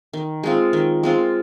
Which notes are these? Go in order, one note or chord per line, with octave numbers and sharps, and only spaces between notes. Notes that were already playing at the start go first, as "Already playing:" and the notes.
D#3
G#3 C4 F4
D#3
G#3 C4 F4